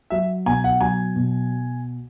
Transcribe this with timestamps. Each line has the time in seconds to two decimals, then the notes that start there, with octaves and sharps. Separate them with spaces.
0.10 F#3 E5
0.46 B2 G#5
0.64 F#5
0.81 F#3 G#5
1.16 B2